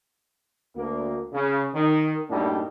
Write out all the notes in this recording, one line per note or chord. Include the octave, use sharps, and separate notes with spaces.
D2 A#3
C#3
D#3
F#2 A2 G3 A#3 D4 D#4